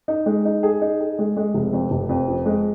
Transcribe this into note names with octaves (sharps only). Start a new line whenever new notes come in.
D#4
G#3
D#4
G#4
D#4
G#4
G#3
G#3
F1
F2
F1
F2
F3
G#3